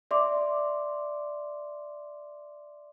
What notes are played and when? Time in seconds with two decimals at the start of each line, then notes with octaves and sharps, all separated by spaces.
0.11 D5 E5 C6 D6